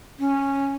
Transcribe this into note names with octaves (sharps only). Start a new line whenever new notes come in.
C#4